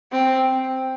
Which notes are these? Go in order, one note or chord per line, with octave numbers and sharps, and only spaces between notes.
C4